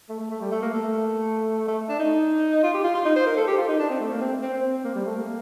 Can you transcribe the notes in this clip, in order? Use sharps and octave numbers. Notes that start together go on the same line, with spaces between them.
A3
A3
A3
G3
A3
A#3
A3
A3
D4
D#4
F4
G4
F4
F4
D#4
C5
A#4
A4
G4
F4
D#4
D4
C4
A3
A#3
C4
C4
C4
A#3
G3
A3
A#3